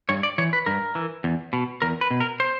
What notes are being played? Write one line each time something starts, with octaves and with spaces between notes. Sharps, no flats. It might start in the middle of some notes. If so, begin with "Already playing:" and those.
G2 C#5
D5
E3 C#5
B4
G2 A#4
E3
E2
B2
E2 A#4
B4
B2
A#4
C5